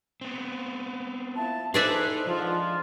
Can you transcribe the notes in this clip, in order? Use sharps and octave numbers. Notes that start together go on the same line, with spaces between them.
B3 C4
F3 E4 A5
A1 D#4 G#4 A4 B4 C5 D5 E5
G#2 F3 D4 F4